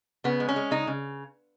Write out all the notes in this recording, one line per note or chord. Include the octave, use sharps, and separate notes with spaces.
C#3 B3
G#3
C#4
G#3
C#3 D#4
C#3